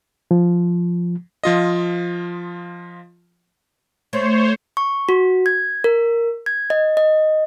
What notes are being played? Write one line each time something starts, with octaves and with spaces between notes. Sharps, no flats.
F3
F3 F4 D#5
A3 C5 C#5
C#6
F#4
G#6
A#4
G#6
D#5
D#5